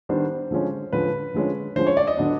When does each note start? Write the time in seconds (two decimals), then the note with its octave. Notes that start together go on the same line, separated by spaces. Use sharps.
0.09 D#3 G3 B3 D4 C5
0.51 D3 F3 G#3 C#4
0.93 D3 F3 G#3 C#4 B4
1.34 D3 F3 G#3 C#4
1.76 D3 F3 G#3 C#4 C5
1.87 C#5
1.97 D5
2.07 D#5
2.17 D3 F#3 B3 D4